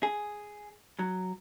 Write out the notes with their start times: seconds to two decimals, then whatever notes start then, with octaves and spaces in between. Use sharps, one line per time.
0.03 G#4
0.99 F#3